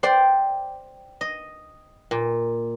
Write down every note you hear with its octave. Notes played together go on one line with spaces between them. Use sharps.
C5 D5 G5
D#5
A#2